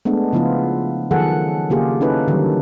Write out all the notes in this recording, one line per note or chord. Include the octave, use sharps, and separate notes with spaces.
G#3 A3 B3 D4
C#3 F3 B3 E4 F4
D#3 F3 F#3 G#4 A4 F#5
C#3 A#3 F4 G4 G#4
C#4 D#4 E4 A4 B4
D3 D#3 F#3 G3